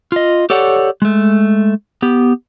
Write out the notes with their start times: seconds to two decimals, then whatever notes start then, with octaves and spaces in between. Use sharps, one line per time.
0.12 F4 D#5
0.50 G4 A4 C#5 D5 F#5
1.02 G#3 A3
2.02 B3 G4